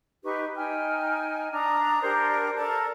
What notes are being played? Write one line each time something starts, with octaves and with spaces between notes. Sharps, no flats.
D#4 G4 B4 C#6
D#4 G5 G#5 F6
D4 A#5 D#6
D4 G4 A#4 C5
A4 A#4 D5 A5